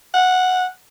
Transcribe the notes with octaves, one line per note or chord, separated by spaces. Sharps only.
F#5